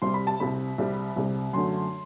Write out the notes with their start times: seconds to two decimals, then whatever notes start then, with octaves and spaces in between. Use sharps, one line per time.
0.02 C2 C3 G3 C6
0.14 B5
0.27 A5
0.40 C2 C3 G3 B5
0.78 C2 C3 G3
1.16 C2 C3 G3
1.53 F#2 D3 A3 C6